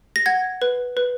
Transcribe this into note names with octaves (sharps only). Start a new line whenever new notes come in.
A#6
F#5 G#6
B4
B4